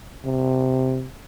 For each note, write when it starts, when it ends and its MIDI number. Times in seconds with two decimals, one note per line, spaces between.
0.25 1.08 48